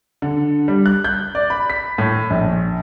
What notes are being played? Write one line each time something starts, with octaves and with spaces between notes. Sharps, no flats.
D3
G3
F#6
G6
D5
B5
B6
A2
A#1